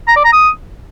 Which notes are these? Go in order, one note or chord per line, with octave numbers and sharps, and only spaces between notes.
A#5
D5
A#5
D#6